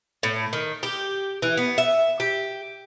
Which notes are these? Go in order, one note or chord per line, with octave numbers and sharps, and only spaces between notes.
A2
D#3
G4
E3
B3
E5
G4